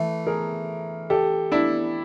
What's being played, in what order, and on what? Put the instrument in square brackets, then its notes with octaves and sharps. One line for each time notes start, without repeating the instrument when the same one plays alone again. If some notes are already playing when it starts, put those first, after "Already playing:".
Already playing: [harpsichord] E3 A3
[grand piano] G#4 A#4
G4 A4
D4 E4